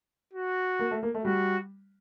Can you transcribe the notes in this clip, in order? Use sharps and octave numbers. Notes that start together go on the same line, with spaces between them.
F#4
A#3
A3
A#3
A3
G3 F#4